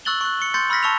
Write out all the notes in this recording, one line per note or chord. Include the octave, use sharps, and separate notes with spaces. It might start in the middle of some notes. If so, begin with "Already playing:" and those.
C#6 E6 F#6 A6 F#7 G7
C#6 F#6
C#7 G7
C6 G6 A6 C#7
B5 E6 F6 A#6 B6
A5 C#6 E6 F7